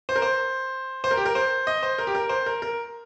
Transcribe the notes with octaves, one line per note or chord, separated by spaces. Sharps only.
C5
A#4
C5
C5
A#4
G4
A#4
C5
D#5
C5
A#4
G4
A#4
C5
A#4
A#4